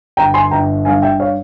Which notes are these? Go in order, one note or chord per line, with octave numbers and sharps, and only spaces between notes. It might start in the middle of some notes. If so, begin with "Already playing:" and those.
G1 G5 A#5
G#5 C6
G1 G5 A#5
G2 F5 G#5
E5 G5
C#5 F5